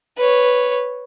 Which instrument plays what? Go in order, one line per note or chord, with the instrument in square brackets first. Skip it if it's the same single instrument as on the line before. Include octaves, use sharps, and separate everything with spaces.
[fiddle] B4 C#5